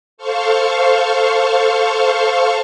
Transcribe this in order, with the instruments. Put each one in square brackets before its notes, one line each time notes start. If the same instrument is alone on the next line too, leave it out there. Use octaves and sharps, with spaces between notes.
[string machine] A4 C5 F5 C#6